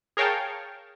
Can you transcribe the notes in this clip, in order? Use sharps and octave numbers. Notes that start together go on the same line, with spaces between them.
G#4 A#4 C#5 F5 G5 A5